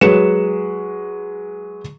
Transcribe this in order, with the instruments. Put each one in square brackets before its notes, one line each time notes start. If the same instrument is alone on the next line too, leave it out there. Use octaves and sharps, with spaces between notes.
[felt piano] F#3 G#3 B4 C#7 E7